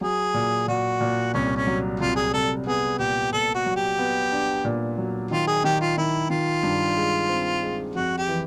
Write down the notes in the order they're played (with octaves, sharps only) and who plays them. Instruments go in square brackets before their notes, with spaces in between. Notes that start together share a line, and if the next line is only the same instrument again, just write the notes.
[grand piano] F#3 [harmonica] G#4
[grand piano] A#2
[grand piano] A#2 [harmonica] F#4
[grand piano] A#2
[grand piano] C2 [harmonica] C#4
[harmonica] C#4
[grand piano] F#3
[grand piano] C2 [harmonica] F4
[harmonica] G#4
[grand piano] C2 [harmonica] A4
[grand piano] B3 [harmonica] G#4
[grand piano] A#2 [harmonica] G4
[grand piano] A#2 [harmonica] A4
[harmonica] F#4
[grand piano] F#3
[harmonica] G4
[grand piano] B3
D4
A#2
F#3
[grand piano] D#3 [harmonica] F4
[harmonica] G#4
[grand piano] D#3 [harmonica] G4
[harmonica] F4
[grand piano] D#3 [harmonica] E4
[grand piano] D#3 [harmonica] F4
[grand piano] G2
G#3
C4
G#3
[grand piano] F2 [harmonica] F#4
[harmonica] G4
[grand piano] E3